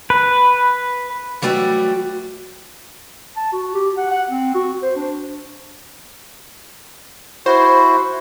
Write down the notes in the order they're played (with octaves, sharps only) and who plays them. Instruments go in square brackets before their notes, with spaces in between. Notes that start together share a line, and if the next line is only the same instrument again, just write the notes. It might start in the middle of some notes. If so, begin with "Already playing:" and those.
[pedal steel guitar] B4
[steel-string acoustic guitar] E3 F#3 G3 A3 F#4 G4
[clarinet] A5
F#4
G4
F#5
F#5
C4
F#4
C5
D4
[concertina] E4 F#4 [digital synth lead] C5